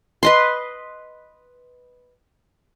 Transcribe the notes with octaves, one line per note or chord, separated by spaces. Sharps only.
B4 D#5 C6